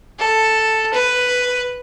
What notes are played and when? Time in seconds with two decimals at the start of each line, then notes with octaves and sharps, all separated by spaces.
0.20 A4
0.93 B4